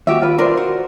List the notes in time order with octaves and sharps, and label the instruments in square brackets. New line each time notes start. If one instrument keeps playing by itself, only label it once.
[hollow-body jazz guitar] D#2 [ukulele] F#4 G4 E5
[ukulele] F4 B4
[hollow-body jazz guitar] D4 F4 D5 [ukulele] A#4 C5
[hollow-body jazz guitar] F#4